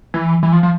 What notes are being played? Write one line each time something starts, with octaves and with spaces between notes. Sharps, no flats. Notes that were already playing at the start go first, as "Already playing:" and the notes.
E3
E3
F3
F3